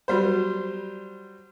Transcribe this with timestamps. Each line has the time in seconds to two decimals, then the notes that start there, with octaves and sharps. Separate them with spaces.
0.08 F#3 G3 C5